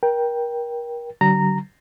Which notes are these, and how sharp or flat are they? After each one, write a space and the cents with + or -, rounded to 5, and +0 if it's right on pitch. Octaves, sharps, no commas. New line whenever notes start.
A#4 +30 G5 +0
D3 +0 F#3 +45 A#5 -10